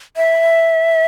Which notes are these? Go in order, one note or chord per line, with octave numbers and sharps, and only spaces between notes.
E5